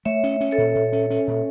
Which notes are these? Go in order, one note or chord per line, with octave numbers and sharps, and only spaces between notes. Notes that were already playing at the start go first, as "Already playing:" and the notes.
A3 C#5 E5
C#4
C#4
A4 C#5
A#2
A#2
C#4
C#4
A#2